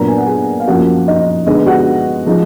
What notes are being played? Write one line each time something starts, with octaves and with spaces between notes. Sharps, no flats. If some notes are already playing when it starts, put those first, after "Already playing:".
Already playing: A#2 F#3 B3 D4 A#4 A#5
G#5
F#5
G#4 G#5
F5
F#2 F3 A#3 F#4 F#5
D#4 D#5
D3 G#3 B3 D#4 D#5
F#4 F#5
F3 G#3 D#4